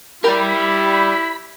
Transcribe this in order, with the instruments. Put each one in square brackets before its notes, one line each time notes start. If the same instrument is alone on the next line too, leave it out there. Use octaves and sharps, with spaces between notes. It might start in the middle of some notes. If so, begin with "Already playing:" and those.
[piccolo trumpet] E4 [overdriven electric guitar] G4 D5 [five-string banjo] A#4 [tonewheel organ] B5